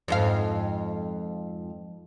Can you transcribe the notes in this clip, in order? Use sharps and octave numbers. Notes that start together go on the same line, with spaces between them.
F2 G#2 F5